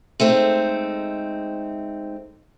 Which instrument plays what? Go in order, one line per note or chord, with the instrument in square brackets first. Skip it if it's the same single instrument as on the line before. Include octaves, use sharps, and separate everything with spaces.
[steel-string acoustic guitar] G#3 A3 C4 D#4